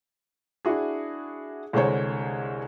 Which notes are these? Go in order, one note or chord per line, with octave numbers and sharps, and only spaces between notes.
D4 E4 F#4 G#4
C2 D3 G#3 C5 C#5